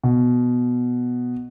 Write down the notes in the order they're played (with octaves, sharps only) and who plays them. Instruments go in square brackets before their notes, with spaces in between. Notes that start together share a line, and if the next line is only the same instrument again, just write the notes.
[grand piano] B2